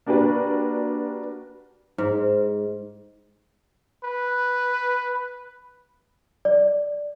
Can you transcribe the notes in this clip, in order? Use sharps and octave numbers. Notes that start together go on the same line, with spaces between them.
A#3 D4 F#4 G4 B4
G#2
B4
D5